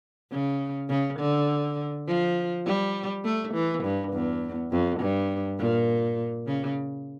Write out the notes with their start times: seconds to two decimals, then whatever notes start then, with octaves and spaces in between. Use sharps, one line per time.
0.32 C#3
0.90 C#3
1.20 D3
2.08 F3
2.66 G3
3.24 A3
3.54 E3
3.84 G2
4.13 E2
4.71 F2
5.00 G2
5.59 A#2
6.47 C#3